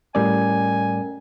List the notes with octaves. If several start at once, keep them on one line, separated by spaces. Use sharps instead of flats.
A2 G3 A3 C#4 A#4 D5 G#5